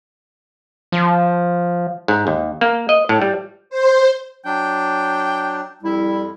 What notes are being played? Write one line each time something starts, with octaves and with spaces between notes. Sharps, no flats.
F3
G#2
D#2
A#3
D#5
A2
G3
C5
F#3 D4 G5
F2 G3 E4